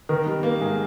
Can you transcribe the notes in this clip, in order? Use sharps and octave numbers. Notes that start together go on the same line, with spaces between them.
D#3 A#4
G3
A#3
G#2 G#4